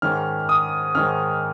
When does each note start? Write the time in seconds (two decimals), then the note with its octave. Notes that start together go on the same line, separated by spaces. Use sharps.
0.02 G#2 D#3 C#4 F6
0.49 D#6
0.95 G#2 D#3 C#4 F6